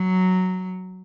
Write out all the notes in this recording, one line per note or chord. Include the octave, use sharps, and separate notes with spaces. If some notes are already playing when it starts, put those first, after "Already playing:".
Already playing: F#3